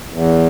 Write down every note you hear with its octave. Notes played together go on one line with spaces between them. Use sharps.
E2